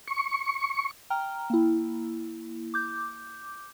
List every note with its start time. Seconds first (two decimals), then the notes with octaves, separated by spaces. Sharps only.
0.08 C#6
1.10 G5 A#5 F6
1.50 A#3 E4
2.74 D6 G6